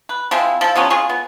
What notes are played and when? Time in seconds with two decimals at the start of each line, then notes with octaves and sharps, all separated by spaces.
0.09 B4
0.31 F3 G#3 C4 E4
0.61 F3 A4
0.76 C3 F3 B3 C#4
0.90 G#3 F4 G#4 C#6
1.09 B3